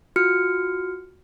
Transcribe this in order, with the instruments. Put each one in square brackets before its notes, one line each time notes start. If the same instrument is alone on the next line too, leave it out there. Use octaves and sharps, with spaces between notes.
[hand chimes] F4 F#4 F6 C#7